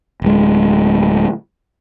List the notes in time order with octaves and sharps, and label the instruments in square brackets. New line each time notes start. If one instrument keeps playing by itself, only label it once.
[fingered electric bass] D1 G#3